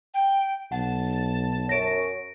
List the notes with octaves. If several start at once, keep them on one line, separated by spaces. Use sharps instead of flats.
G5
B1 F#5 A5
F#2 C#5 A#6 D7